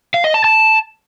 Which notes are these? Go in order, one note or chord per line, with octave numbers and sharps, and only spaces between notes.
F5
D#5
A5
A5